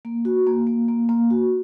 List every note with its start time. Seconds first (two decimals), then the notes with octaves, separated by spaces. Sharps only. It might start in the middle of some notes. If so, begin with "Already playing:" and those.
0.05 A#3
0.25 F#4
0.47 A#3
0.67 A#3
0.88 A#3
1.09 A#3
1.30 F#4